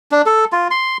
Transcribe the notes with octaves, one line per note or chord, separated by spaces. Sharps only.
D4
A4
F4
C6